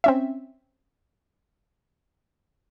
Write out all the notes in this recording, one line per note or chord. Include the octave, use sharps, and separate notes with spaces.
C4 C#4 E5